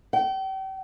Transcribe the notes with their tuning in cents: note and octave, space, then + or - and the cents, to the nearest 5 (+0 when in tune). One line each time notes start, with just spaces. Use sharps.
G5 -35